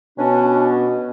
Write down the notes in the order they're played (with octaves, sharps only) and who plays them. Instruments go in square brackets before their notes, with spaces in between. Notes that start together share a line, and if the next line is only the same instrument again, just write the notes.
[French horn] B2 [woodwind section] C#4 D4